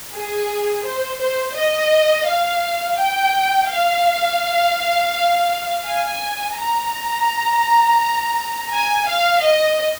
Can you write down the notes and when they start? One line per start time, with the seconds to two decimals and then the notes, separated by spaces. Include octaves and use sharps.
0.13 G#4
0.84 C5
1.20 C5
1.55 D#5
2.27 F5
2.98 G5
3.70 F5
5.85 G#5
6.56 A#5
8.72 G#5
9.07 F5
9.43 D#5